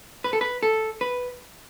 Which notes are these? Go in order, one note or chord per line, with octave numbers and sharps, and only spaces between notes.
B4
A4
B4
A4
B4